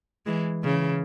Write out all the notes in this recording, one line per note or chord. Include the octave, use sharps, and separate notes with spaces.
E3 G#3
C#3 E3